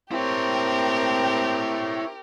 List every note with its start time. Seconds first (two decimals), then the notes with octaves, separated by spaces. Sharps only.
0.12 C4 E4 G4 A#4 C#5